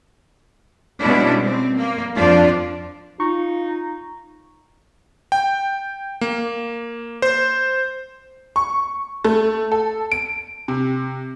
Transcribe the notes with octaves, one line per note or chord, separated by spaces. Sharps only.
B2 G3 G#3 C#4 D4 E4
C4
A#3
F2 F3 D4 F4 D5
D#4 F4 C#6
G5
A#3
C5
C#6
A3
A4
D7
C3